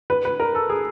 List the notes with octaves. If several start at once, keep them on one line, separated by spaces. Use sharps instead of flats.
B4
B4
A#4
A4
G#4